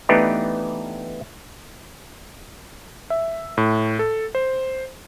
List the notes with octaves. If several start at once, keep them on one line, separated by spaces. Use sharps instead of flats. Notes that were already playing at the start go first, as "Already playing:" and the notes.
E3 A3 B3 D4 D#4 G4
E5
A2
A4
C5